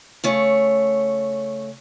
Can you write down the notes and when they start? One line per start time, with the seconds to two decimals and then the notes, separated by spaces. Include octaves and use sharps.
0.24 C#3 A3 C#5